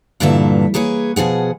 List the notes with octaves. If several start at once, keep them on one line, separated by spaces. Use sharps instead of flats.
G2 A#2 D3 E3 E5
A#3 G#4 B4 C#5
B2 F3 G#4 F#5